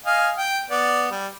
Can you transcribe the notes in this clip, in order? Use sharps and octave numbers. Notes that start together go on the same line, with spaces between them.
D#5 F5 G#5
G5
B3 D5
G3